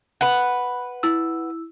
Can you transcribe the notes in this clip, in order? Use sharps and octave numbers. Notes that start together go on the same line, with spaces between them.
B4 F#5
E4 E6